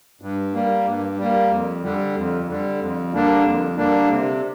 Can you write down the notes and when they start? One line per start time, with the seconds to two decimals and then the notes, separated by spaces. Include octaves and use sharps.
0.21 G2
0.54 G3 A#3
0.86 G2
1.18 G3 A#3
1.50 F2
1.83 D3 G3
2.15 F2
2.47 D3 G3
2.80 F2
3.12 D3 G3 A#3 D4
3.44 F2
3.77 D3 G3 A#3 D4
4.09 C3